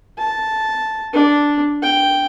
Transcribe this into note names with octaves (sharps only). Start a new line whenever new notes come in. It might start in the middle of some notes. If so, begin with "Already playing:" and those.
A5
D4
G5